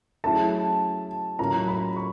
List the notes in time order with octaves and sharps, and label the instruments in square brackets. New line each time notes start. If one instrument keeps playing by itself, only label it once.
[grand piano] F#3 A3 C#4 E4 G#4 [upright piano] A5
[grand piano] A2 F#3 A#3 C#4 F4 [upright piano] A#5
[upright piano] B5
C#6